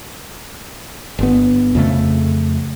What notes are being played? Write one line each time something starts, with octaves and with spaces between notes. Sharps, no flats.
G1 B3
F2 C#3 A3